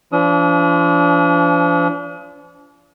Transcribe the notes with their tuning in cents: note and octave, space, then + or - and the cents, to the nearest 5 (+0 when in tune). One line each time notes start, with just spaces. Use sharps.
F3 -40 D4 -35 D#6 +30